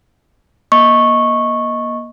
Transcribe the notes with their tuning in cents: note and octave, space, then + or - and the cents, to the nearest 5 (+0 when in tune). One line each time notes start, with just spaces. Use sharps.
A#3 +30 D#5 +10 C#6 -10